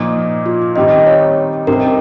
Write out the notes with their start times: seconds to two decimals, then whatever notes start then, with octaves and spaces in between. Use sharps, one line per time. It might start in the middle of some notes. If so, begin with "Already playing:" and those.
Already playing: A#2 F3 A#3 D#4
0.46 F4
0.76 D#3 G3 C4 D#4 D#5
1.07 C#5
1.67 C3 G3 C4 D#4 A#4